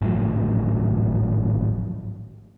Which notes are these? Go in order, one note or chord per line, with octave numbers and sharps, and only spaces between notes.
G#1 A2 F3 F#3